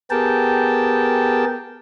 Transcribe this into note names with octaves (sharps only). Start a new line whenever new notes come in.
B3 G4 G#4 A#4 G5 A5